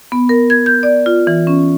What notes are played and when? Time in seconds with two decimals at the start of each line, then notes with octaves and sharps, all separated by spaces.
0.12 B3
0.29 A#4
0.50 G#6
0.66 G6
0.83 D5
1.06 F4
1.27 E3
1.47 C#4